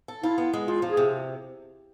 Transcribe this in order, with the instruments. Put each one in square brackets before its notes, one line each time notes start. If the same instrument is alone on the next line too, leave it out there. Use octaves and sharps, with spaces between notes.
[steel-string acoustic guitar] A4
[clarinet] E4 [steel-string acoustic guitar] F4
[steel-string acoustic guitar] B3
G#3
[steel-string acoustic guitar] E2 [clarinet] F4
[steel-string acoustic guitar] F3
[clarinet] G#4
[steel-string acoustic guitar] C3